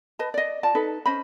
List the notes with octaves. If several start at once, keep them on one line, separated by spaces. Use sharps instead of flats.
B4 D#5 A5
D5 D#5
F4 D5 A5
D#4 A4 B4
C#4 C5 D#5 B5